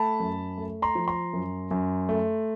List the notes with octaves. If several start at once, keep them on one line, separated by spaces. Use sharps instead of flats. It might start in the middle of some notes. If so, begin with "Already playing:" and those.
Already playing: A3 A5 B5
F#2
A3
A#5 C6
F3
A#5 C6
F#2
F#2
A3